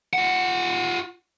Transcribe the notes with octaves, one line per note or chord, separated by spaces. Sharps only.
F4 F#5